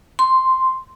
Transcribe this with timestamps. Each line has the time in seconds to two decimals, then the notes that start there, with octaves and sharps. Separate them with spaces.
0.19 C6